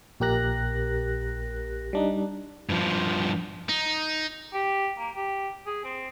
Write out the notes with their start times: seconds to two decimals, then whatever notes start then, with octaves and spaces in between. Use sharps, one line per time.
0.20 A#1 A#2 G4 A#4 F#6 A#6
1.93 G3 D4 D#4
2.69 G2 F3
3.69 D#4
4.53 G4
4.98 A#3
5.16 G4
5.66 G#4
5.85 C4